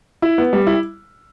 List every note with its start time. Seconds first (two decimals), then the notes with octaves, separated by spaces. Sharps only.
0.22 E4
0.38 B3
0.53 G3
0.67 E4